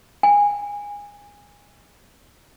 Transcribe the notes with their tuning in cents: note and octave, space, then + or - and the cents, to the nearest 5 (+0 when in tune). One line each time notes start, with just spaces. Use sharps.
G#5 -20